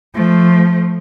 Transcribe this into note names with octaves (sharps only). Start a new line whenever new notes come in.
F3 A3